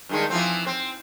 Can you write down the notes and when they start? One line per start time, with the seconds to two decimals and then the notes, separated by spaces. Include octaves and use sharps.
0.09 G2 D#3 G#3
0.30 E3 F3 C4
0.67 C4